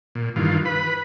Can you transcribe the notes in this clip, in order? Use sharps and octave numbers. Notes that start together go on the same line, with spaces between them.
A#2
G2 D#3 E3 F4
B4 B5